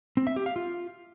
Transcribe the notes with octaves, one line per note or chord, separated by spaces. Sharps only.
C4
E5
G4
F5
F4